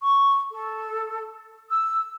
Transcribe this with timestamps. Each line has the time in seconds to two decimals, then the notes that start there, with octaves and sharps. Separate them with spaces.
0.02 C#6
0.52 A4
1.70 E6